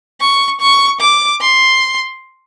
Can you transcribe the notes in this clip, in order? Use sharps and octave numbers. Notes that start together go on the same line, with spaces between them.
C#6
C#6
D6
C6